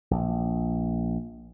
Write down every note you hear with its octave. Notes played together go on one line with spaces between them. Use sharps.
A#1